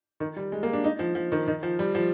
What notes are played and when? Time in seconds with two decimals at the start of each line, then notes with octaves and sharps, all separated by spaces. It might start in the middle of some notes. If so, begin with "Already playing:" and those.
0.20 D#3
0.36 G3
0.52 G#3
0.63 A#3
0.73 D4
0.84 D#4
0.99 F3
1.15 F3
1.32 D#3
1.48 D#3
1.63 F3
1.79 G3
1.95 F3